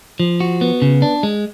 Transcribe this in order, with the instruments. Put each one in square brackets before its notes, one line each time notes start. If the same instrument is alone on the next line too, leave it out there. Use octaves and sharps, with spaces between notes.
[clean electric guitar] F3
F#4
B3
C#3
D4
G#3